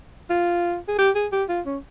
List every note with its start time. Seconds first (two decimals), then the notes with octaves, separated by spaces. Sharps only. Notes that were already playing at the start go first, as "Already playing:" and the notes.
0.30 F4
0.88 G#4
0.98 G4
1.15 G#4
1.32 G4
1.49 F4
1.66 C#4